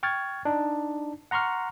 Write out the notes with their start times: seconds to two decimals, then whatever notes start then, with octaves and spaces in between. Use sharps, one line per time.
0.03 G5 C#6 F6 G#6 A6
0.45 D4 D#4
1.31 F#5 A#5 C6 C#6 F6